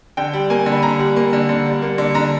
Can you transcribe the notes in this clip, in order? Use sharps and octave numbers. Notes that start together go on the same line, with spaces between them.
D3 G5
G3
A#3 G#5
D3
B5
D3 A#5
G3
A#3
D3
D3
G3
A#3
D3
D3 A#5